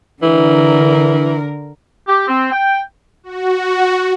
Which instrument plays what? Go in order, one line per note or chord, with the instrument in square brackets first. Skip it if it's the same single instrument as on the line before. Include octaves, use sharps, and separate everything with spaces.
[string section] D3 A#4 [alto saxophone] E3
[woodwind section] G4
C4
G5
[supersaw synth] F#4